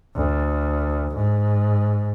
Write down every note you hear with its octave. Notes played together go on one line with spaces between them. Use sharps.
D2
G#2